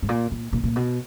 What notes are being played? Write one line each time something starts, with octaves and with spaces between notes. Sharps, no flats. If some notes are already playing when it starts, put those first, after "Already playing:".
G#2
A#2
A#2
A#2
A#2
B2